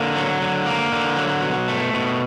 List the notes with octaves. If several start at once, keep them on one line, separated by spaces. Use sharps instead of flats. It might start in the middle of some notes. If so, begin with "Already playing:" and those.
Already playing: D3 A#3
F#3
D3
A#3
D3
F#3
B2
A3
B2